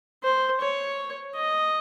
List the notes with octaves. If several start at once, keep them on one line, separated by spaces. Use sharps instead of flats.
C5
C#5
D#5